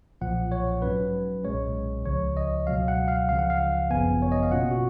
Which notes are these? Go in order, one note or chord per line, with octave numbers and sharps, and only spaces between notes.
B1 A#2 F3 F#5
C#5
G#2 F#3 C#4 B4
B1 A#2 G#3 C#4 C#5
C#2 C#3 F3 C#5
D#5
C#2 B2 F#3 F5
F#5
F5
C#2 C#3 F3 F5
F#5
F5
G#1 F#2 C#3 F3 B3 G#5
C#5
D#5
F5
B2 A#3 C#4 F4 F#5
F#4